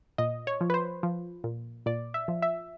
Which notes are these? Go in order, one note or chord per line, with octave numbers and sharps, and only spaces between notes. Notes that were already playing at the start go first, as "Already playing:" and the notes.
A#2 D#5
C#5
F3
B4
C5
F3
A#2
A#2 D5
E5
F3
E5